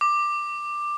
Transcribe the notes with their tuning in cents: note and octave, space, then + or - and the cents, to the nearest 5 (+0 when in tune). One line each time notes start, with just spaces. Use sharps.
D6 +10